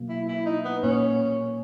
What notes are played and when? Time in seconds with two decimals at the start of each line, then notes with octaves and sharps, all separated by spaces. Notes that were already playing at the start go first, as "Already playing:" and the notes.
Already playing: B2 F#3 A#3
0.09 E4
0.28 E4
0.46 D#4
0.65 B3
0.83 A#2 A#3 C#4 D#4